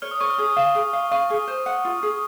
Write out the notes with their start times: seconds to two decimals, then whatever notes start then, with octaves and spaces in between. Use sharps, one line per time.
0.02 C#5 F6
0.11 D#6
0.20 C#5 C#6
0.30 F6
0.38 G#4 D#6
0.57 F5
0.75 G#4
0.93 F5
1.11 F5 C#6
1.30 G#4
1.48 C5
1.66 F#5
1.85 F4
2.03 G#4